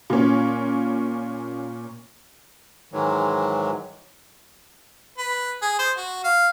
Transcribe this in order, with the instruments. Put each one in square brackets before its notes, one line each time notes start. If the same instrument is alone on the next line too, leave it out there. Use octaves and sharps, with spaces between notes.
[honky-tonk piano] A#2 C#4
[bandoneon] G#2 D#3 E3 F#3 G#3
[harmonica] B4
G#4
C5
F#4
F5